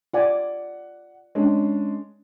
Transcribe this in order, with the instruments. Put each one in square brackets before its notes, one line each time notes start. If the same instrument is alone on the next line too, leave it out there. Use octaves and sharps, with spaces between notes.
[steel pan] F4 D5 G#5 [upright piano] F#5
[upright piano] G#3 C#4 D4